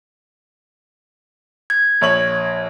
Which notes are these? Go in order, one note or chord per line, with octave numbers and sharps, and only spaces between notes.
G#6
A#1 C#5 F#7